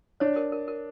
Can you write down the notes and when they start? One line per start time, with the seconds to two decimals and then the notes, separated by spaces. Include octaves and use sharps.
0.20 D4 C#5
0.36 A#4
0.52 A#4
0.68 A#4